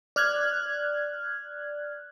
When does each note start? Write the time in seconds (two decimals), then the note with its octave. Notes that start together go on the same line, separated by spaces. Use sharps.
0.16 D5 F6 F#6 G#6